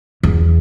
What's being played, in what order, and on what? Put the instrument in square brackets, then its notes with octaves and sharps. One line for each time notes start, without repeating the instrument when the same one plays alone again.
[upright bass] E2